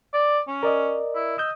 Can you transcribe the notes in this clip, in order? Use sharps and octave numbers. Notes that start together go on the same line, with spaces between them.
D5
C#4
A#4 D5 D#5
E4
D#5 E6 G6